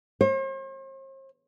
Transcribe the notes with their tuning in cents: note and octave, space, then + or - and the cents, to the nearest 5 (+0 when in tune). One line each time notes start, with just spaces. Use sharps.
C5 +45